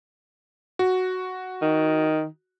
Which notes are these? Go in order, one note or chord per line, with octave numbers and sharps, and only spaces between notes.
F#4
D#3